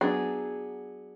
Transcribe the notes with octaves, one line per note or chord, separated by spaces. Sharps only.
F#3 B3 D4 G#4